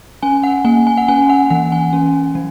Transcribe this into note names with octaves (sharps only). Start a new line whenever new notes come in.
C#4 G#5
F#5
A#3 G#5
G#5
F#5
C#4 G#5
F#5
E3 F#5
G#5
C#4
F#3